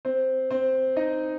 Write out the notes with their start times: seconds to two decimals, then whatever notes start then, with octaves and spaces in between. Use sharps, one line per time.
0.05 C4 C5
0.51 C4 C5
0.97 D#4 D#5